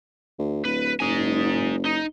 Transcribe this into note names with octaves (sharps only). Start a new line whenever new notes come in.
D2
D1 B4
F#1 D#4 G#5
D#4